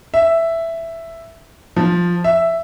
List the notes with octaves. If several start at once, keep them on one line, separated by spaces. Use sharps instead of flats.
E5
F3
E5